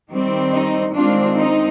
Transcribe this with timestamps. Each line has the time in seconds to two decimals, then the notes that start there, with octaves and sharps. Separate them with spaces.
0.11 D#3 G3 C4
0.54 D#4
0.95 D#3 G#3 C4 D4 F4
1.38 D#4